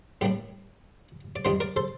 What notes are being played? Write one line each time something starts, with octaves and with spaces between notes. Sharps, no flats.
A2 G3 A#3 D4 G4
D5
F2 D#3 G3 D4 C5 D#5
A#4 D5
A4 C5